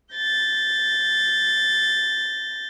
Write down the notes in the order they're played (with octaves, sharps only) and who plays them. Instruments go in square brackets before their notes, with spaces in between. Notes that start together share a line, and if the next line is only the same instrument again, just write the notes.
[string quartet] G6 A6 A#6